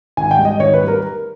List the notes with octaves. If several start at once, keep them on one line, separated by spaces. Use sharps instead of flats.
G#1 G#5
G5
G#2 G3
D#5
G#1 C#5
B4
G3 A#4